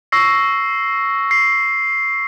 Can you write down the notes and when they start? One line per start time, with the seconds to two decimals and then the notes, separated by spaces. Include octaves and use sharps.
0.12 C#6 E6 A#6 C7
1.31 C7